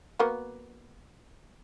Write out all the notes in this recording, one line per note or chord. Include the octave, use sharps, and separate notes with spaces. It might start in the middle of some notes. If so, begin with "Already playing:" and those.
A#3 B3 F#4